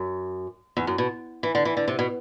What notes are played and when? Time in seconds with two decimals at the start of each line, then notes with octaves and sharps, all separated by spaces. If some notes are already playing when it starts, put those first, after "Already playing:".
Already playing: F#2
0.77 E2
0.87 F#2
0.98 B2
1.43 E3
1.55 D3
1.65 E3
1.77 D3
1.88 C3
1.99 B2